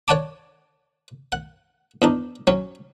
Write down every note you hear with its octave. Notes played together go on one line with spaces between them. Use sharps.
C#5 D5 F#5 G#5 A5 D6
F#5
E2 D4 D#4
F#3 C#4